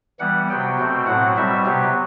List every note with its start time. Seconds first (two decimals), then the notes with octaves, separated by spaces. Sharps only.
0.20 E3 G3 B3 F#5
0.49 C3 F#3 B3 G5
0.78 B2 A3 C4 G5
1.07 A2 F#3 C4 F#5
1.37 B2 G3 C4 E5
1.65 C3 F#3 B3 G4